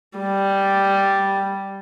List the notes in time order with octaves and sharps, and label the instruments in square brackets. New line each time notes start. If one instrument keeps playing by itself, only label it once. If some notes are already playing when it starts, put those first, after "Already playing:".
[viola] G3